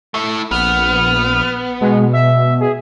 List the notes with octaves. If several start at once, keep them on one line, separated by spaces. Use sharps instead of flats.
A3 E4
A#1 B3 F6
B2 G#3
E5
G#4